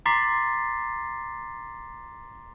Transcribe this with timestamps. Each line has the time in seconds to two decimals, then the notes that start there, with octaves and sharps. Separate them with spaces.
0.06 A#5 C6 D6 A6 B6 C7